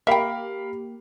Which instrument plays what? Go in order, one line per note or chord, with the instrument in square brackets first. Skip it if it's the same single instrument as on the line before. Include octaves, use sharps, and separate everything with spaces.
[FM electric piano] A#3 G4 [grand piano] A#4 F5 B5 [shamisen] E5 G5